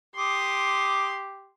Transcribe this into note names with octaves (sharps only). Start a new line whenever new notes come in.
G4 C6 D6 D#6